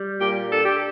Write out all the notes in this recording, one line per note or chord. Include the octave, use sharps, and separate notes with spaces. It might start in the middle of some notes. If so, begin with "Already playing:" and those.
Already playing: G3
A#2 G4
D4 A4
G4